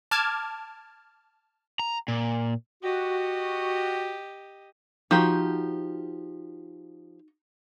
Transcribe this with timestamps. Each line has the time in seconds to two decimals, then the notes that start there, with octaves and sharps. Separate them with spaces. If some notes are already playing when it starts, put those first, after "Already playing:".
0.11 A5 D6 F6 G#6
1.79 A#5
2.08 A#2
2.83 F#4 G4 D#5
5.11 F3 D#4 F#4 G4